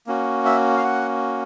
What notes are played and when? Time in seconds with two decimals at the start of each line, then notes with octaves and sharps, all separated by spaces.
0.07 A#3 C#4 F#4
0.45 E5
0.77 F5
0.84 F#5